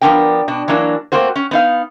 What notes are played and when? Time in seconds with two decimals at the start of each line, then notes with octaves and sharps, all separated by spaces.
0.01 F3 B3 C4 D4 A#4 G5
0.48 B2 D4
0.68 E3 F#3 A#3 D4
1.12 A3 A#3 C4 F#4 C5
1.36 C#4
1.51 B3 D#4 F5